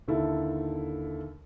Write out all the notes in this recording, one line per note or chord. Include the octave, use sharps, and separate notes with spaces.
D#2 D3 E4 A4